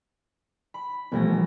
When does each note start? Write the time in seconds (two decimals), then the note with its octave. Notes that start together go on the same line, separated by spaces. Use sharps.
0.74 B5
1.12 E1 A#1 G3 A3 B3 A#6